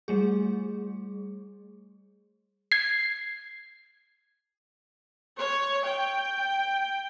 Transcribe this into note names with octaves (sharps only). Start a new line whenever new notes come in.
G3 A3 G#4
G#6 C7
C#5
G5